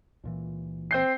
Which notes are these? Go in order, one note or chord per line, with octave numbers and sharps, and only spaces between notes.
C#2 A#2 E3
C4 G6 C7